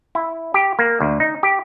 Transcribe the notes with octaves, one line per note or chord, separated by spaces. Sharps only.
E4
G4
A#3
D2
D#4
G4